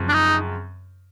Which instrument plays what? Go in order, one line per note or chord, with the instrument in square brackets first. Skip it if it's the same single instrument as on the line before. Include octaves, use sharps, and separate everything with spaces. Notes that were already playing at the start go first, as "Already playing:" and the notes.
Already playing: [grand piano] F#2 C#3 F3 G#3 C4
[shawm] D4
D#4